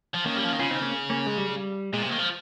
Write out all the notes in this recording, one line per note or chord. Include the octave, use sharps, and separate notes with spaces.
F3
D#3 A#3 C#4
G3
F3
D#3
C#3 C#4 F4
C4 D#4
A#3 C#4
A#3 C#4
G#3
G3
G3
A#2 G#3
C3
A#3
D#3
F3